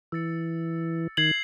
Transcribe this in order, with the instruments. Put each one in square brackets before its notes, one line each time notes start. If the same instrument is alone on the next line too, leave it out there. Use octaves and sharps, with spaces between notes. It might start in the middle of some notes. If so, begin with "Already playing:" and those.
[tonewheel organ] E3 [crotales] E6 A6 C#7
[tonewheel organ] D#3 [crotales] G#6 C7 F#7